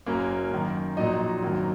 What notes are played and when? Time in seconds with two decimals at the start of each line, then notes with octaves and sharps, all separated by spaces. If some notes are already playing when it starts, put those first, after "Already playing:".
0.06 F#1 F#2 F#3 A#3 C#4 A#4
0.52 F#2 D#3 A#3
0.97 A#1 A#2 F#3 D#4 D#5
1.42 G#1 F#2 D#3 F#3 A#3